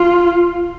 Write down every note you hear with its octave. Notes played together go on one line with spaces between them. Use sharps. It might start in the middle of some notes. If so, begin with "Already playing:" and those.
Already playing: F4